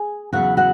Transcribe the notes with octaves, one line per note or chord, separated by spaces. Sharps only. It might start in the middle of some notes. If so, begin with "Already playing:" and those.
Already playing: G#4 G#5
E2 C#3 F#3 B3 F#4 F#5
F#4 F#5